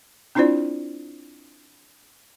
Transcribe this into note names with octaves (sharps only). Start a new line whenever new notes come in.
C4 D4 E4 F4 C5 D5